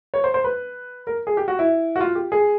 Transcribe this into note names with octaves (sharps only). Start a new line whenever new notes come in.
C#5
C5
C5
B4
A#4
G#4
G4
F#4
E4
F#4
F4
G4
G#4